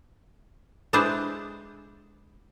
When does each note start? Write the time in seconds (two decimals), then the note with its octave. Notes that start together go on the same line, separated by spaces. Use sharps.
0.93 G#3 D4 E4 B4 C5 A5